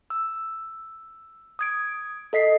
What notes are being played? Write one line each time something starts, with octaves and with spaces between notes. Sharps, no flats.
E6
D#6 G#6 D7
A4 D#5 B6 C7